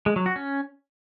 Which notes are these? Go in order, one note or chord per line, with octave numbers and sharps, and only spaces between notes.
G#3
F#3
F#4
C#4